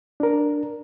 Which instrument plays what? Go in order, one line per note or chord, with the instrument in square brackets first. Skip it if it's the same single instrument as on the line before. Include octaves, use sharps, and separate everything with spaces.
[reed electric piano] D4 A#4